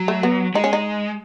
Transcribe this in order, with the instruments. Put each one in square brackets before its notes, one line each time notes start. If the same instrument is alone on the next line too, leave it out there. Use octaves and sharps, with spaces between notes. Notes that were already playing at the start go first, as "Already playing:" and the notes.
Already playing: [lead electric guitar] F#3
[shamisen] A3
B3
[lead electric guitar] G#3 [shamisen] D#4
[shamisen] C#4
D#4